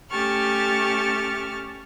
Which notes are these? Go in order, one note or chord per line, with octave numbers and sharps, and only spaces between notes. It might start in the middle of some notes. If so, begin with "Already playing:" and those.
A3 C#4 G4 A5 C#6 F6